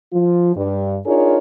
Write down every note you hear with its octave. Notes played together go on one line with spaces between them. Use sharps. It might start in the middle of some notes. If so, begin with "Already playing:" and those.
F3 F4
G2
D4 D#4 F4 G#4 A#4 C#5